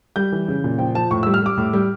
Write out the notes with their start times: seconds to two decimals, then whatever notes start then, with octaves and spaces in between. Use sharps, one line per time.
0.16 G3 G6
0.32 E3
0.48 C#3
0.64 A#2
0.79 F3 G5
0.95 F3 A5
1.11 A2 C#6
1.23 E6
1.27 G3
1.34 F6
1.42 G3 D6
1.57 A2
1.73 G3